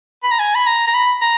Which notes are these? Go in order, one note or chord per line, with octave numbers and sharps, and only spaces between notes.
B5
A#5
G#5
B5
A#5
A#5
B5
A#5